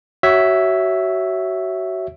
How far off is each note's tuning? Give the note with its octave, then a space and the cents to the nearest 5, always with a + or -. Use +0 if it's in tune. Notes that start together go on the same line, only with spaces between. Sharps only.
F#4 +25 C#5 +0 E5 +0